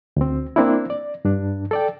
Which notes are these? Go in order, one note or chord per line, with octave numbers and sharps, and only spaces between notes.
D2 C4
A#3 C4 D4 E4
D5
G2 D4
A4 D5 G5